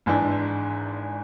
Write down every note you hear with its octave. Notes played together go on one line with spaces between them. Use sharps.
G#1 G#2 E3 G#3 D4